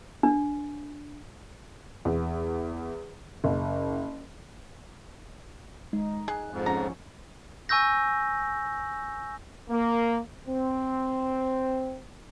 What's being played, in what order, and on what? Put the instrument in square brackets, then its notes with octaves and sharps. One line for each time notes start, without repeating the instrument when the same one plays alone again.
[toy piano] D4
[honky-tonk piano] E2
F#1
[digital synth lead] G#3 [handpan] D#4
[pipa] G#4 [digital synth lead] F#6
[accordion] F2 G#2
[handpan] F3 C#4 [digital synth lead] F#5 [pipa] A#5
[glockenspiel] G#5 C#6 E6 G6 A#6
[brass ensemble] A#3
C4